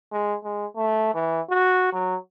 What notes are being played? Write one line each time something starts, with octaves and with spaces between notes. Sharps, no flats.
G#3
G#3
A3
E3
F#4
F#3